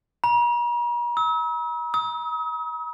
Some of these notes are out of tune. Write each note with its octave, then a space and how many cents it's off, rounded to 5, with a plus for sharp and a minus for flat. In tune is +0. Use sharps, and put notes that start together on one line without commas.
A#5 +45
E6 -40
D#6 +40